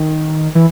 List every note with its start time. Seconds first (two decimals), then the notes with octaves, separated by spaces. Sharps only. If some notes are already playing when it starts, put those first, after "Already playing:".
Already playing: D#3
0.55 E3